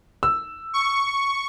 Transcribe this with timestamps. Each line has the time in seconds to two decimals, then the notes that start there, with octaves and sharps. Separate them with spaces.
0.23 E6
0.74 C#6